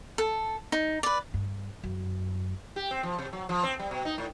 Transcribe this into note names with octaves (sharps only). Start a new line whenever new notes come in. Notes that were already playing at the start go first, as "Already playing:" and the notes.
A4
D#4
B4 D5
G2
F#2
G4
C4
F3
C3
F#3
F3
C4
G3
B2
D#4
A2